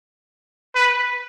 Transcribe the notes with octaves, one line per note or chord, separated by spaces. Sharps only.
B4